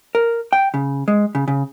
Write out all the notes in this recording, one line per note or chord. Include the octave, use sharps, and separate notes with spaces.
A#4
G5
C#3
G#3
C#3
C#3